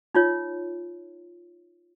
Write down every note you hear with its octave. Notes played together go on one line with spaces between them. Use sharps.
D#4 F4 C#5